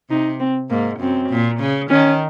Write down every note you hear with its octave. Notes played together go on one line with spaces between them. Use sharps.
C3 D#4
C4
G#2 A#3
F#2 C4
A#2
C#3
D#3 C#4